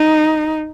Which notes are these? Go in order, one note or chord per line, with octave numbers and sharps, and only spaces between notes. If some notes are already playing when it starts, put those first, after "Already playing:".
Already playing: D#4